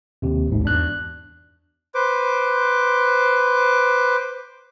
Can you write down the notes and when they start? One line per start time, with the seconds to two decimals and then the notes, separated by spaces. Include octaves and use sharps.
0.22 D#2 C3
0.48 A1 D2 G#2
0.63 E2 D4 F#6
1.95 B4 C5 D6